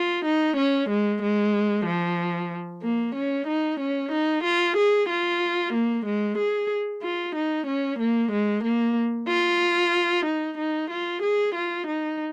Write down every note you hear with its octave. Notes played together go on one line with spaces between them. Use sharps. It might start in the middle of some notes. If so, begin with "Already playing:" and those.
Already playing: F4
D#4
C#4
G#3
G#3
F3
A#3
C#4
D#4
C#4
D#4
F4
G#4
F4
A#3
G#3
G#4
F4
D#4
C#4
A#3
G#3
A#3
F4
D#4
D#4
F4
G#4
F4
D#4